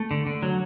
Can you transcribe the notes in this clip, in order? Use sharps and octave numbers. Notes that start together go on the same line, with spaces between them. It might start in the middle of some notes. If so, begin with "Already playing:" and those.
Already playing: A3
D3
D3
F#3